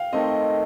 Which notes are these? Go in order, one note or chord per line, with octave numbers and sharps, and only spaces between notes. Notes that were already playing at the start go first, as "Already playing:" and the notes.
Already playing: F5 G5
D#3 A3 C4 D#5